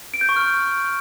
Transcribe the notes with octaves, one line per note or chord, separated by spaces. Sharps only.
D7
G6
C#6
F6